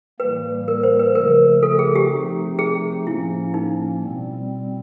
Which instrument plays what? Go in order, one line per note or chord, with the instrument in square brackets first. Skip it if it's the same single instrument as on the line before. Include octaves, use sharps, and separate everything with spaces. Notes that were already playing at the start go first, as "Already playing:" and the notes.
[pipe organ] A2 E3 G3 A#3 [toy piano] B4
[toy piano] A#4
C5
B4
[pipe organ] C#3 F3 A3 [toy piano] A#4
[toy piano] A4
G#4
G4
[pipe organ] C3 F3 A3 C4 D#4
[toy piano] G#4
[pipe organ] A2 F3 A#3 C#4 [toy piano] E4
[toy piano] D#4
[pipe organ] B2 G3 C4